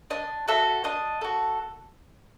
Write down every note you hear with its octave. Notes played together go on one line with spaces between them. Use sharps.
D4 D#5
F#4 A4 E5
D4 D#5
F#4 A4